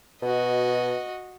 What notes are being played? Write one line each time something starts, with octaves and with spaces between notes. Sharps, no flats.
B2 F#4 D#5